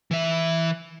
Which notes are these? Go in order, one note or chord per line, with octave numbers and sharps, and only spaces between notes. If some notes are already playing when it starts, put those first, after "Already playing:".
E3 E5